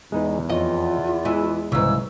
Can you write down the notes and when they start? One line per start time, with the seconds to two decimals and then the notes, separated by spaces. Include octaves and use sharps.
0.12 E2 G#3 D#4 B4
0.50 F2 F4 C#5 D#5
1.25 E3 G#3
1.72 C2 G#2 C#3 E3 E6